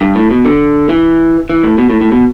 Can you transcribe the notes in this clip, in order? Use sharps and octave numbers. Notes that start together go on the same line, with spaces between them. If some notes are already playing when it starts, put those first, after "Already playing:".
G2
A2
B2
D3
E3
E3
A2
B2
A2
A2
B2